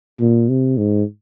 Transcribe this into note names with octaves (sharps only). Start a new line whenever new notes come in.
A#2
C3
G#2